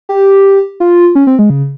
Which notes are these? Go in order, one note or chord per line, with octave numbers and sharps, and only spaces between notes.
G4
F4
C#4
C4
G#3
C#3